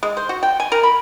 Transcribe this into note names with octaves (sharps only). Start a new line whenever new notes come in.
G#3
C5
F#4
G5
G#5
A#4
B5